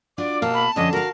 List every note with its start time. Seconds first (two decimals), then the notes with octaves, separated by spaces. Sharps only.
0.18 D4 F4 F#4 D5 D6
0.42 B2 A#3 A5
0.54 B5
0.76 F2 D3 C#4 D#5
0.93 F#4 A#4 F5